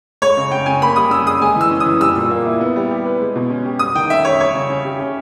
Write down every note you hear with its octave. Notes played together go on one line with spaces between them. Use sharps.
G#3 C#5
C#3
C#4 G5
C#3 G#5
A#3 B5
G3 D#6
C#4 E6
G#4 D#6
G#3 G#5
E3 E6
C#4
D#6
E3
G3 E6
A#2
A#3
E4
B3
G3
G4
B4
G#3
B2
C#4
G4
G3 D#6
D#3 G5
C#4 E5
G4 C#5
G3 C#5
C#3
C#4
G4
C#4